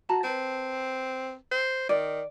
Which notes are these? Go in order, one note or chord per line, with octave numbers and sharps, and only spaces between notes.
F#4 A5 A#5
C4 B4 A5
C5
D#3 D5